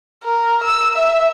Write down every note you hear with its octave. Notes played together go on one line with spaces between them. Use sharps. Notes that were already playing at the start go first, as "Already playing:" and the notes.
A#4
E6
E5